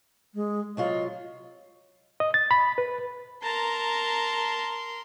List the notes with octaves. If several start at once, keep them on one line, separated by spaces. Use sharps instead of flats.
G#3
C3 F#3 F4 D#5
D#5
A6
B5
B4
A#4 A5 A#5 C6